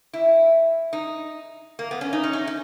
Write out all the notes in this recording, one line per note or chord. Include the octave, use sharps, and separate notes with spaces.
E4
D#4
A#3
B3
C#4
D#4
C#4
D#4
C#4